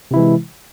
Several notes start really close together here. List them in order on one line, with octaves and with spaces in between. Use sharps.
C3 E4 E3 G#3